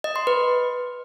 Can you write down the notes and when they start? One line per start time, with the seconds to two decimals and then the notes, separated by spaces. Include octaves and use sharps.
0.04 D#5
0.16 C6
0.27 B4